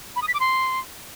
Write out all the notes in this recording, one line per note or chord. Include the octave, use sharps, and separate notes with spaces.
B5
D#6
B6
D6
C6